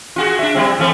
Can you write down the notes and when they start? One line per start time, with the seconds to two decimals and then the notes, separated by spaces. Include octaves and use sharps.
0.16 F4 F#4 G#4
0.39 D4 E5
0.55 F3 G3 C4
0.79 E3 A3 C4